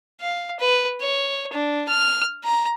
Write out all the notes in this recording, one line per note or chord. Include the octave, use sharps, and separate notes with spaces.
F5
B4
C#5
D4
F6
A#5